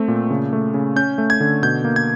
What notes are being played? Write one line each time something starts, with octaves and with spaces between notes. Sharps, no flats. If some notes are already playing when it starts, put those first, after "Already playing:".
Already playing: A3 C4
A#2
C#3
A3
C#3
C#4 G6
A3
G#6
D3
B2 G6
A#3
G#6